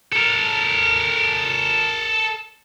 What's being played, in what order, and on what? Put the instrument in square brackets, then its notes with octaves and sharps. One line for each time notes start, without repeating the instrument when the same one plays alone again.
[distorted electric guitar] A4 A#4